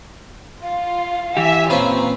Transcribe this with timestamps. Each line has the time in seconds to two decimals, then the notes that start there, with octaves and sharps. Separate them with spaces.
0.62 F4 F5
1.37 E3 G4 E5 G#5
1.70 A#2 C4 C#4 F4 B4 A#5